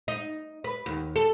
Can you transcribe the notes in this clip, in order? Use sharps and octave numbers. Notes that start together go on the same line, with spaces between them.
D#4
B4
D#2
A4